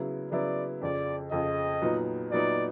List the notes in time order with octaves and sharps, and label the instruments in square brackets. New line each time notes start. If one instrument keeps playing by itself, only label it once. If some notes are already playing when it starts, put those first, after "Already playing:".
Already playing: [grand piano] C#3 F#3 B3 E4
[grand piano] C#3 F#3 B3 E4 [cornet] D5
[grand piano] F2 C#3 F3 [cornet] D5
[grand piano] F2 C#3 F3 [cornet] D#5
[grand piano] A#2 F#3 B3 D#4
[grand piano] A#2 F#3 B3 D#4 [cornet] D5